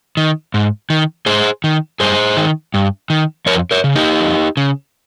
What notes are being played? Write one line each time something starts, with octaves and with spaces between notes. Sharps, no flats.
D#3
G#2
D#3
G#2 G#4 C5
D#3
G2 G#4 C5
D#3
G2
D#3
F2 A#4 C#5
A#4 C#5
C#3
D#4 G4
F2
C#3